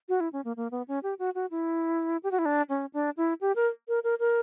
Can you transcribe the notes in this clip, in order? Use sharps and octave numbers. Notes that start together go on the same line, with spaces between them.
F#4
E4
C#4
A#3
A#3
B3
C#4
G4
F#4
F#4
E4
G4
F#4
E4
D4
C#4
D4
E4
G4
A#4
A#4
A#4
A#4